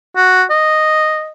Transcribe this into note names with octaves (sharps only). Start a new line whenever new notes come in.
F#4
D#5